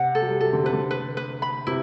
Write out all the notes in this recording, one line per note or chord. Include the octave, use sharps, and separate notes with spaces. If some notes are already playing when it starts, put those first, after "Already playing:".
Already playing: C3 F#5
A4
F#3
G3
F#3 A4
D3
C3 B4
D3
B4
B4
B5
C3 E4